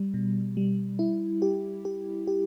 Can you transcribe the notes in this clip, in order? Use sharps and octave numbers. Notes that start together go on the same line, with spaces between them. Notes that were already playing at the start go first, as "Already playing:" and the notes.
Already playing: G3
B2
G3
E4
G4
G4
G4